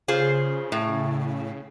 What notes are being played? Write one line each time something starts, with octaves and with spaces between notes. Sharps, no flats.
C#3 F4 G#4 C5
A2